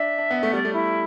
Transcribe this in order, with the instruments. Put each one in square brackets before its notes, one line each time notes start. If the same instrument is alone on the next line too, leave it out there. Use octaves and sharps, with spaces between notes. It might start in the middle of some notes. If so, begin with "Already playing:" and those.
Already playing: [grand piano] D4 [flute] E5
[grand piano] D4
B3
A3
[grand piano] G3 [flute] D5
[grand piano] A3
[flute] E4